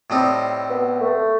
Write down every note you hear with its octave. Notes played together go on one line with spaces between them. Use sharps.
A2 G3 C4 D#4
B3
A3